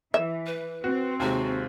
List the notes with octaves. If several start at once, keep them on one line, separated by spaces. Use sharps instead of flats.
E3 E5
B4
C4 F#4
D#2 C3 G#3 F#4